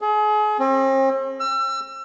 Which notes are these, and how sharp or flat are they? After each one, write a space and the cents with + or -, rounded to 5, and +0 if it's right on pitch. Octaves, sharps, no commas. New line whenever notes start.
G#4 +35
C4 +45
E6 +35